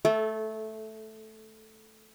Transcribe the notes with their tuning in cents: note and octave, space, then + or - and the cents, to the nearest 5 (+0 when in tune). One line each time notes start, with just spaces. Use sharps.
A3 -5 A4 -25